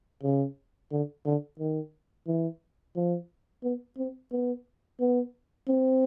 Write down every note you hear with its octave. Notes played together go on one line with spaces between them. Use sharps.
C#3
D3
D3
D#3
E3
F3
B3
C4
B3
B3
C4